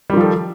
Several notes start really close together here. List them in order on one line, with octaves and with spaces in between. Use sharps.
G3 D#3 F3 A4